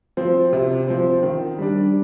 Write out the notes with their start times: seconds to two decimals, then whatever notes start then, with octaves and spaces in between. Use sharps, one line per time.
0.17 F3 C4
0.53 C3
0.87 F3 C4
1.23 D#3
1.58 G3 D4